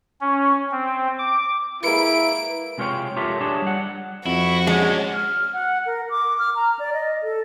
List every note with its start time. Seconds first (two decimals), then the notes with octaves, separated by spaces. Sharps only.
0.21 C#4
0.72 C4
1.19 D6
1.83 G#3 A#3 E4 B4 D7
2.78 C3 G#3 F4 G4 C#5 G5
3.16 F4 G4 A4 A#4 C#5 E5
3.41 D4 G4 G#4 C#5 A5
3.62 G3 F#5
4.26 F2 E4 F#4
4.67 G#3 C#4 D4
5.13 F6
5.53 F#5
5.86 A#4
6.10 D6
6.39 F6
6.55 A#5
6.79 D5
6.93 D#5
7.23 A4